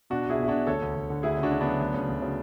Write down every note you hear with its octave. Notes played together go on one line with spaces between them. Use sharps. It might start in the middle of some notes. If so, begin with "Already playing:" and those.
B2 D4 F#4
B1 E4 G#4
B1 E4
B2 D4 F#4
D2 A4 C#5
D2
D2
D3
D2 E4 G#4
C#3
D4 F#4
C#3
B3 D4
F#3
D2
C#3
D2
C#3